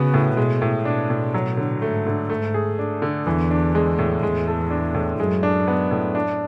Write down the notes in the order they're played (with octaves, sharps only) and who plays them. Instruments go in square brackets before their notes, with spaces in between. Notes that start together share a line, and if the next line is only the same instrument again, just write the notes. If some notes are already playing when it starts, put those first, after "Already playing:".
Already playing: [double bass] C#3 [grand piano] B3 F#4
[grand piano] A2
[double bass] B2 [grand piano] G#3
[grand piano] A2
[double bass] B2 [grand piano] D4
[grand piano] A2
F#3
D3
[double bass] G#2 [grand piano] A3
[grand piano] D3
[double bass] G#2 [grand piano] A3
[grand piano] G#4
D4
D3
[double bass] E2 [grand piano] E3
[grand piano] D4
G#3
A2
[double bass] E2 [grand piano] G#3
[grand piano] A4
D4
A2
[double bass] F#2 [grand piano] G#3
[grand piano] D4
B3
A2
D4